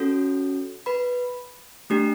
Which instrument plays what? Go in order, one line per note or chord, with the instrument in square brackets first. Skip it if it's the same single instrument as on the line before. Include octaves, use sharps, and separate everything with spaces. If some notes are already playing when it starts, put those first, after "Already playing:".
Already playing: [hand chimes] C#4 F#4 A4
B4 B5
A3 D4 G4